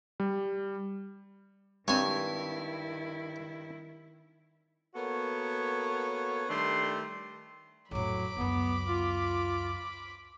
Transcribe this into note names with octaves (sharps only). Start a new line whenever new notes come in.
G3
G2 D#3 G#3 C4 E4 C#5 G#5
A#3 B3 F#4 A4 C#5
D#3 G3 A3 D4 C6
F2 A2 F#3 B5 D6
C#2 F#2 B3
F4